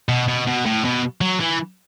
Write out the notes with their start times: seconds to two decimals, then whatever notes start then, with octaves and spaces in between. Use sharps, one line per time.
0.09 B2
0.28 B2
0.47 B2
0.66 A2
0.85 B2
1.21 F#3
1.40 E3